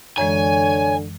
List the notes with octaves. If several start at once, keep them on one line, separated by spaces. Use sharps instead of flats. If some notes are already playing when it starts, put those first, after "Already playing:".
F#2 D3 E3 G#3 C#5 G#5